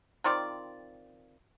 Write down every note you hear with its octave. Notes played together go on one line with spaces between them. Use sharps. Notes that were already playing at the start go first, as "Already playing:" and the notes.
D#3 C4 F4 D5